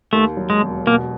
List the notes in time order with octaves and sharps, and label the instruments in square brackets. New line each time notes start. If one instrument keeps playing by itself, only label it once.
[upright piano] D#2 [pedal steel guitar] A3
[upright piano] F#3
[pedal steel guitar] G#3
[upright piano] E1
[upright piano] B2 [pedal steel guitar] A#3